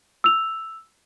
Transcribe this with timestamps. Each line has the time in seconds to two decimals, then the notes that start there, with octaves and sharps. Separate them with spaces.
0.24 E6 F7